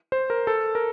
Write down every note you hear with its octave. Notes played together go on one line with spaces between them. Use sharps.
C5
A#4
A4
A#4